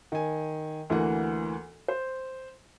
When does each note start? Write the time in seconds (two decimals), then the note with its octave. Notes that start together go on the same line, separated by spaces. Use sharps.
0.12 D#3 G#5
0.90 D2 E3 A#3 F#5
1.88 C5